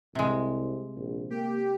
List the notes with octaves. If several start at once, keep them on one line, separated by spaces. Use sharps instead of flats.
C2 C3 G#3
A#1
A#3 G4